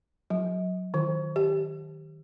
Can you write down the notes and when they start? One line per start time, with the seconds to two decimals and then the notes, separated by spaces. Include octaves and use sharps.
0.30 F#3
0.94 D#3
1.36 G4